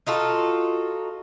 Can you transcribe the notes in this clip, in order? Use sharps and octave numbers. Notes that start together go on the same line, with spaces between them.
D#4 F4 F#4 A4